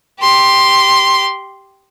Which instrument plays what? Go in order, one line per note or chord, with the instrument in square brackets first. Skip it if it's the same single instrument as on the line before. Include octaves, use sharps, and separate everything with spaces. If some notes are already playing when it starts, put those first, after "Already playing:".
[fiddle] G4 C6